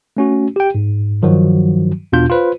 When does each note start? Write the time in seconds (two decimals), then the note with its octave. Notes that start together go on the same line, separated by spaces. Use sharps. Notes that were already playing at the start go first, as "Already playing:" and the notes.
0.17 A3 C#4 F#4
0.56 G4 G5
0.75 G#2
1.22 G2 D#3 F3 F#3 F#4
2.12 E2 B2 D4 F4 G6
2.29 F4 B4 C5